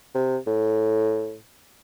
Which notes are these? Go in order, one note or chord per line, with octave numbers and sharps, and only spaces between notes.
C3
A2